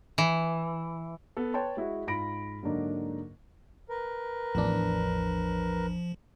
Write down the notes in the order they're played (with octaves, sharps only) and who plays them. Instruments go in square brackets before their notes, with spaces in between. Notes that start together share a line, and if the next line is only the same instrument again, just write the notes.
[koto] E3
[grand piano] B3 A4
B4 C#5 G5 A5 C6
G#3 E4 F#4
G#2 F4 B5 A#6 D7
G#2 D3 F#3 A#3 D4 D#4
[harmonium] A#4 B4
[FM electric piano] A1 E2 D4 [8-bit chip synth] F3